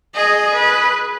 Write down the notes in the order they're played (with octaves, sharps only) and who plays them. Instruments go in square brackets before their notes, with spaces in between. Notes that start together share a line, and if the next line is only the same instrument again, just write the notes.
[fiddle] G#4 [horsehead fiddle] D#5
[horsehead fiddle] B4